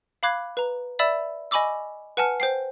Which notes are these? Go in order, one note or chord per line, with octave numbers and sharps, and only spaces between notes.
F5 B5 D6 F#6 G#6 C7
B4 A#5
D5 E5 B5 E6 E7
D#5 G#5 B5 C#6 D6 E6
B4 F#5 G#5 A5 F6 C#7
C5 G5 C7